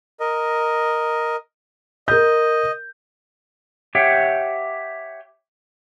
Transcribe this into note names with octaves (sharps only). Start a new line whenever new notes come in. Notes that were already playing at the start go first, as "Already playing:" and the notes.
A#4 D#5
A#4 D#5 G6
G4 C#5 E5 F#5 G5